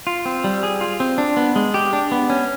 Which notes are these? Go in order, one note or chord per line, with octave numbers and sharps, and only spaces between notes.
F4
C4
G3
G#4
F4
C4
D4
B3
G#3
G4
D4
B3
C#4